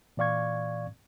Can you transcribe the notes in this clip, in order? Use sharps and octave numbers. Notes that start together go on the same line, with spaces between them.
A#2 E3 D5 F5 C#6 G#6